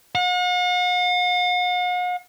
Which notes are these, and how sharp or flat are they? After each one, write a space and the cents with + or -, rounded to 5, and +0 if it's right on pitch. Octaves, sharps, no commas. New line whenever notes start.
F#5 -45